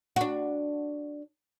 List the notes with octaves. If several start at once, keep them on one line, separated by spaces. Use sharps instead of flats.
D4 F#4